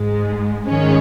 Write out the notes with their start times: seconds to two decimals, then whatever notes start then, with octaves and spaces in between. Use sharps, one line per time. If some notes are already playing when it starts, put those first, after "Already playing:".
Already playing: G#2 G#3
0.66 G#2 D#3 G#3 C#4